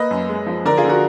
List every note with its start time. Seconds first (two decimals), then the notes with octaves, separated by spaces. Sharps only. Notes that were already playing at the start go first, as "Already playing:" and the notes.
Already playing: A#3 B4 D#5
0.11 F#2
0.29 G#3
0.47 F3
0.65 D3 A#4 D5
0.77 F4 G#4
0.84 D3
0.89 F#4 A#4